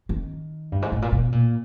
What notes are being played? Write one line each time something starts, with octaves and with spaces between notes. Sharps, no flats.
D#3
G2
G#2
A2
A#2
B2
A#2